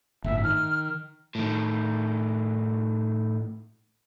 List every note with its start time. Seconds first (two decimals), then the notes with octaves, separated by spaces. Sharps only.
0.24 G1 A2 E5
0.44 D#3 F6
1.35 A2 D#3